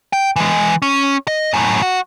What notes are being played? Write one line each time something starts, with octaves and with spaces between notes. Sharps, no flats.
G5
E3 G#3
C#4
D#5
F#2 A2
F#4